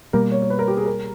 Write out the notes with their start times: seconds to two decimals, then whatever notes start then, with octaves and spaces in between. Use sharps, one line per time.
0.13 B2 G3 A#3 A#4
0.32 C#5
0.42 C#5
0.50 B4
0.59 A#4
0.68 G4
0.77 G#4
0.86 A#4